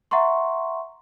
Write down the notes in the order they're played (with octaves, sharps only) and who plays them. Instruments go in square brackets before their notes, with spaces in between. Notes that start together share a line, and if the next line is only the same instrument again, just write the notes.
[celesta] E5 F#5 A#5 C6 C#6